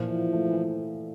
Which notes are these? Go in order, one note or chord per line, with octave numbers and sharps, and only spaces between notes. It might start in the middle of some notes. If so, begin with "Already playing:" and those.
Already playing: A#2 E3 F3
E4
A3
E3